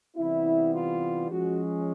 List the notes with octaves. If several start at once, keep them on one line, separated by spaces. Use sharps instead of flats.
C3 E3 G3 B3 E4
F4
F3 G#3 C#4 F#4